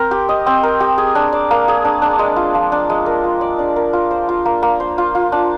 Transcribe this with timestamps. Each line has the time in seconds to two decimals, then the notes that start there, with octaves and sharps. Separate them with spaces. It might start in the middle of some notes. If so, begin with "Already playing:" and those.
Already playing: C4 A#4
0.11 G4
0.29 D#5
0.46 C4
0.63 A#4
0.80 G4
0.98 G#4
1.15 D4
1.33 D5
1.51 A#3
1.68 G#4
1.85 D4
2.02 D4
2.19 G#3
2.36 F4
2.55 F3
2.72 D4
2.89 G#3
3.06 A#4
3.24 F4
3.41 D5
3.59 D4
3.76 A#4
3.93 F4
4.11 C5
4.29 F4
4.46 A#3
4.63 A#3
4.80 C5
4.98 F4
5.15 F4
5.32 D4